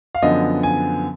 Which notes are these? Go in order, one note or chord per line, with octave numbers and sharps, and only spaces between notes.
F5
F#2 D3 F3 B3 D#5
G#5